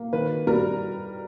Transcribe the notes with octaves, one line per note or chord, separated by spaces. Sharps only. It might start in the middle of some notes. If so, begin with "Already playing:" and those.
Already playing: A#3
D#3 B4
G3 A#4